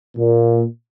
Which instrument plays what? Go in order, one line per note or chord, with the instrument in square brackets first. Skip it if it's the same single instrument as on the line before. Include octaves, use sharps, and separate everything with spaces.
[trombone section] A#2